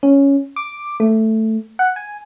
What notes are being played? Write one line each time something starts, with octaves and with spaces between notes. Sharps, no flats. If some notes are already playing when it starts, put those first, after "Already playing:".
C#4
D6
A3
F#5
G#5